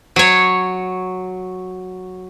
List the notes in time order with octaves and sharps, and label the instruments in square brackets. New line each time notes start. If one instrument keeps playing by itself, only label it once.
[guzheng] F#3 C#5